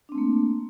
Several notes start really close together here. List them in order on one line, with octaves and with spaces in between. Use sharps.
D4 C4 A3 A#3